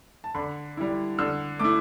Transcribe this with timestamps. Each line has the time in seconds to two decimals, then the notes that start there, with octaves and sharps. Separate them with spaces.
0.24 A5
0.34 D3 B5
0.77 G3 E4
1.18 D3 E6
1.59 A3 E4 D6